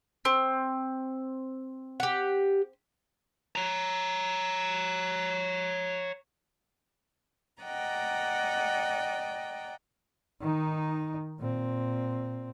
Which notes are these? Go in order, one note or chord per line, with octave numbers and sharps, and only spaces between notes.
C4
G4 F#5
C#5 A#5
D5 D#5 F#5 G5 A#5
D#3 D#4
A#2 C4